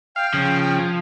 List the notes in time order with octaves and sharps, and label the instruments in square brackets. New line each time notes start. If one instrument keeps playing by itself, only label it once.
[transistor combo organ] F5 [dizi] G5
[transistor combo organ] C#3 [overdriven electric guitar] F3